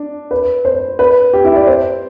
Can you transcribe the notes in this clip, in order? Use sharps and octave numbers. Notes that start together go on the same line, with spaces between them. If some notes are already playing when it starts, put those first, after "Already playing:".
Already playing: D4
B4
C5
B4
G4
E4
D5
C5